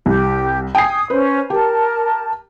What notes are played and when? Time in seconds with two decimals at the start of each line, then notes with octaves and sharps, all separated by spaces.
0.06 C2 G4
0.75 G5 G#5 D#6 C7
1.10 C#4 B4 C5
1.50 G4 A#4 A5